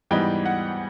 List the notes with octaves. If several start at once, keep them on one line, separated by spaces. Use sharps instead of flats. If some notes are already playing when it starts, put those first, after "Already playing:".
G#2 E3 G3 B3 D#4 G5
F#5